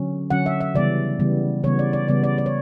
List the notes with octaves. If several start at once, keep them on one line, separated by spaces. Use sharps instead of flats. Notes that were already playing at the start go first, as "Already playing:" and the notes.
Already playing: D3 F#3 C#4
D3 F#3 C#4 F#5
E5
E5
C#3 E3 G3 B3 D5
C#3 E3 G3 B3
C#3 E3 G3 B3 C#5
D5
D5
C#3 E3 G3 B3 D5
D5
D5
C#5